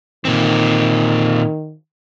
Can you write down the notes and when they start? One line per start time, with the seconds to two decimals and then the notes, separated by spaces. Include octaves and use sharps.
0.25 A#2 D#3 C4